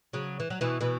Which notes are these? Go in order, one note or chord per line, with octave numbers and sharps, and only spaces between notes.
C#3 F#3
E3
F#3
B2 E3
B2 E3